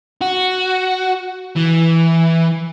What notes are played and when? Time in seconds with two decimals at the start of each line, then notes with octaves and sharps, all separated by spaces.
0.21 F#4
1.56 E3